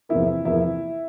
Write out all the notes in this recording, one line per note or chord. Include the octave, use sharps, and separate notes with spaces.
E2 C3 F3 A#3 E4
E2 C3 F3 A#3 E4